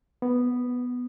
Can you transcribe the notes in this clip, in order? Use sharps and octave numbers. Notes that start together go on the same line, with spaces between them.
B3